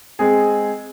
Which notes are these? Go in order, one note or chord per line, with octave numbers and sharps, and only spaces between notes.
G#3 C4 G#4